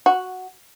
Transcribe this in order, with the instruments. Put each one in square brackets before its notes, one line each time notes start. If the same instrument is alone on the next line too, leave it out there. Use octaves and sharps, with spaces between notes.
[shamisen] F#4